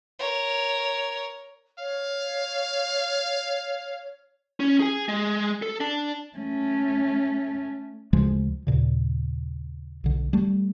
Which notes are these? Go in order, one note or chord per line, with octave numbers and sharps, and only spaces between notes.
A#4 C#5
C#5 F5
C#4
G#4 G#5
G#3
A4
D4
A3 C#4
D2 C#3 F3 G#3
D#2 A#2 C#3
B1 D3
G3 A3